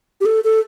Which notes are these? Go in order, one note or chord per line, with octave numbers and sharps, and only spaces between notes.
G4
A4
A4